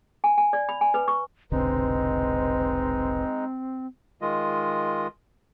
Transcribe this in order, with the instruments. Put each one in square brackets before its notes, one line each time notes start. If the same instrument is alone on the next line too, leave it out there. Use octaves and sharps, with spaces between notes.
[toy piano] G#5
G#5
D5
B5
G#5
B4
C#6
[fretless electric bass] F1 B1 D3 [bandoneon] G#3 D#4 [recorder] C4 [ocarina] B4
[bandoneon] D#3 G#3 F4 D#5